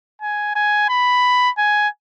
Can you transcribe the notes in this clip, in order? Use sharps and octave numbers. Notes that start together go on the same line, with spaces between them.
G#5
G#5
B5
G#5